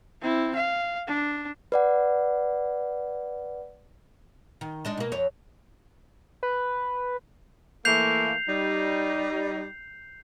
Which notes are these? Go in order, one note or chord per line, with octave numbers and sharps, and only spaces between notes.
C4 E4
F5
D4
B4 D5 F#5
D#3
G#3 D4 D#4
B2 A#3
F2 C#5
B4
E3 A3 A#3 G6 C7 F7
G3 D#4